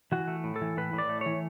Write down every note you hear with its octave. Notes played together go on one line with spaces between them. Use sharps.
E3 F#4
A3
A2
A4
E3
A2 B4
A2
D5
A3
E3 C#5